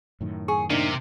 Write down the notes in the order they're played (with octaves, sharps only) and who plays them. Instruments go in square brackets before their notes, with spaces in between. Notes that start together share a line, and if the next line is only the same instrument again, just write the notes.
[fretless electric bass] F#2 A2 D#3
[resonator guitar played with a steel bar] G#4 [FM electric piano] C#6
[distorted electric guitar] C3 [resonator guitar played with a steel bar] A#3 [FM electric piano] D4 D#4